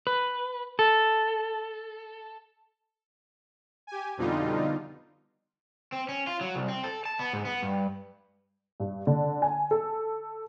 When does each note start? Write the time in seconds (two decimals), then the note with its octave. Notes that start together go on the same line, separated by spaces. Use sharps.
0.07 B4
0.79 A4
3.87 G4 G#5
4.17 F2 B2 D3 G3 D#4 F4
5.92 C4
6.09 C#4
6.27 F4
6.41 F#3
6.56 C2
6.68 C4
6.84 A4
7.05 A5
7.19 B3
7.33 G#2
7.45 B3
7.62 G2
8.80 G2
9.07 D3
9.42 G#5
9.71 A4